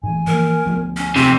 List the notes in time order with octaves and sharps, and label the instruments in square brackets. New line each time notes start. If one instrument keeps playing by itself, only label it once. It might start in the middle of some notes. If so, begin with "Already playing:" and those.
[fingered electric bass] G#2 E3 [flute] G#5
[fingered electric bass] E3 F3 A#3 [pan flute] A#4
[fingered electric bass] D2 F3 B3
[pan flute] C#4
[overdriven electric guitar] F2 C3 [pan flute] C4 [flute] C6